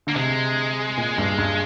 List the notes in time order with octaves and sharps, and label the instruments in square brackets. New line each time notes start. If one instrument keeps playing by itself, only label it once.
[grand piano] D3 [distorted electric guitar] A#3
[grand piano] C3 [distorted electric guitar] G#3
[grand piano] A#2
G2
G2